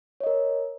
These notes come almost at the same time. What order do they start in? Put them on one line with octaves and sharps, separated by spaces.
C#5 D#5 A#4